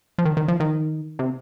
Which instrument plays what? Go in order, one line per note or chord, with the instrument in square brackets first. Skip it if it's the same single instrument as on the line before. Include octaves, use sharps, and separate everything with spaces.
[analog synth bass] F3
D#3
D#3
F3
D#3
C3